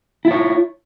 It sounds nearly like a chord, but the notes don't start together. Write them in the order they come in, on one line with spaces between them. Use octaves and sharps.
E4 F4 C#5